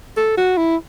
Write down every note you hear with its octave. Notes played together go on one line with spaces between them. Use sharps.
A4
F#4
E4